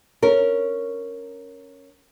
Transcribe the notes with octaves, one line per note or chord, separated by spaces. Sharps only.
C#4 A#4